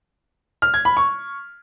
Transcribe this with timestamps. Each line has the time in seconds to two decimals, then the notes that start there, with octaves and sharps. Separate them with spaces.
0.62 F6
0.74 G#6
0.85 B5
0.97 C#6